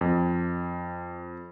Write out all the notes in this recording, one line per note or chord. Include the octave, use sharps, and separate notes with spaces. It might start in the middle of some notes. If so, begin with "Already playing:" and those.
F2